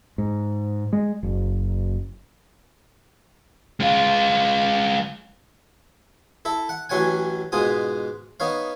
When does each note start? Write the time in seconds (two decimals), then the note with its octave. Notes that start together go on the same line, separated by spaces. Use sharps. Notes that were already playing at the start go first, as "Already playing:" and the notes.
0.18 G#2
0.93 G#3
1.23 F#1
3.80 G#3 F4
6.45 E4 A4 E5
6.69 F#5
6.89 A1 E3 F#3 C#5 F#5 G#5
7.52 G#2 B2 F4 G#5 D#6
8.40 B3 D#4 C#5 F5